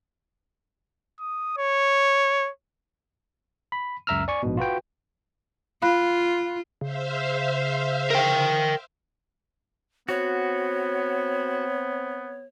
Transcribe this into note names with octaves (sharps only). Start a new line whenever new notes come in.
D#6
C#5
B5
C#2 F#2 E5 A#5 E6 F6
D5 G#5 C#6
A#1 G#2 B2
F4 F#4 B4 G5
F4 F5 B5 F#6
C#3 C5 E5 F5
A#4 G5
B3 C4 F#4 C#5